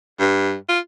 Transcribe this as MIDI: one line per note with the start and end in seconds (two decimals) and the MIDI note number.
0.20 0.55 43
0.69 0.79 65